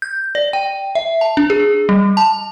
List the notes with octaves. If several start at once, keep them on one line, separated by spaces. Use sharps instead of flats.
G6
D5
G5
E5
A5
D4
G#4
G3
A5